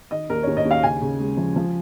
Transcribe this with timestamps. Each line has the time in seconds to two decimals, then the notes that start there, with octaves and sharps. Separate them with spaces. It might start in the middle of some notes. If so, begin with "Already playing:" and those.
0.11 D#3 D#5
0.30 D#2 A#4
0.43 D#2 C#5
0.57 D#5
0.65 D#2
0.71 F5
0.83 C#3 G#5
1.01 C#3
1.20 G#3
1.37 F3
1.56 F3